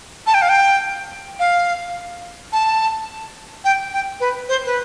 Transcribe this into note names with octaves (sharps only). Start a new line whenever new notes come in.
A5
G5
F5
G5
F5
A5
G5
G5
B4
C5
B4